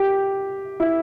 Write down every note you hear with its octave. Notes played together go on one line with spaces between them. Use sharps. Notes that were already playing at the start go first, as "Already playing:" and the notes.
Already playing: G4
E4